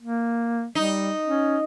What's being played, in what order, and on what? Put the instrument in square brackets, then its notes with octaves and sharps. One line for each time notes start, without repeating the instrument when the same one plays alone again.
[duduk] A#3
[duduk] G3 [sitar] D#4
[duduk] C#4